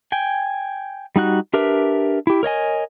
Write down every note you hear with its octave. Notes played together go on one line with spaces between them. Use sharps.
G5 G#5
G3 D#4 F#4 F#6
D4 G4 A#4 B4 E5
E4 G4
A#4 C#5 D#5 G#5